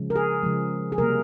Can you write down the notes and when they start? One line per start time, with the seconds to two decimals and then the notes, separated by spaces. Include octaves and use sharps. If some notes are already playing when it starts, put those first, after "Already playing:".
Already playing: C#3 F3 G#3
0.10 A#4
0.16 G#4
0.43 C#3 F3 G#3
0.92 G#4
0.98 C3 G3 A#3 A#4